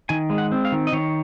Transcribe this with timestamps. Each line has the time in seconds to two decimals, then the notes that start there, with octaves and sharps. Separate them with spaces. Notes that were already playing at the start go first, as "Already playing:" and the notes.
0.09 D#3 G#5
0.30 G#3
0.38 F#5
0.52 C4
0.65 F5
0.72 D#3
0.87 D#5
0.93 D#3 C#5